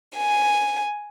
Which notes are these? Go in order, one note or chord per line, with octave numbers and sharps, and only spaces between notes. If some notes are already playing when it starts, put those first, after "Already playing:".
G#5